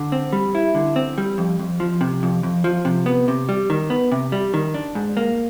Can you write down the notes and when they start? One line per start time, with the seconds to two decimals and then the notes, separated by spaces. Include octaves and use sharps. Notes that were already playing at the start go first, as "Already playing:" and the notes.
Already playing: D3
0.12 C4
0.33 G3
0.55 E4
0.75 D3
0.96 C4
1.18 G3
1.38 F2
1.60 F2
1.80 F3
2.01 C3
2.23 F2
2.43 F2
2.64 F3
2.85 C3
3.06 B3
3.28 C3
3.49 G3
3.70 D#3
3.90 B3
4.12 C3
4.32 G3
4.54 D#3
4.74 D4
4.95 G#2
5.17 A#3